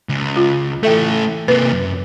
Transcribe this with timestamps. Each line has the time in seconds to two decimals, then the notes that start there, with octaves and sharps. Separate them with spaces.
0.09 C#2
0.36 F4
0.83 E3 A3 A4 E5 G5
1.48 C3 A#3 B4
1.72 F#2